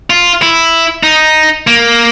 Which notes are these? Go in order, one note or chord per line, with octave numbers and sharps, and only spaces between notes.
F4
E4
D#4
A#3